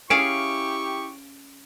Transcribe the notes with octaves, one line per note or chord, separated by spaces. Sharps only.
C#4 E4 G4 G#4 F5 C#6 D7